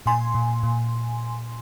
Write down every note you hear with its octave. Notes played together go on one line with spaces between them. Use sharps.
A#2 G#5 C6
A#2
A#2